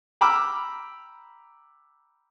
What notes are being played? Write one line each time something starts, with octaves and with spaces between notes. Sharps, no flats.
G5 A#5 B5 D6 E6 F6